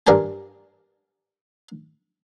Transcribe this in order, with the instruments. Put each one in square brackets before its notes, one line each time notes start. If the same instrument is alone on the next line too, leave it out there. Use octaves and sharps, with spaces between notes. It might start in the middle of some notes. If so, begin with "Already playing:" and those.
[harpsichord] G2 A#4 D5 G#5 A5